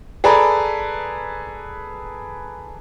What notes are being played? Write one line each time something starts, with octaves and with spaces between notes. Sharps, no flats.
G#4 A4 B4 D5 A#5 B5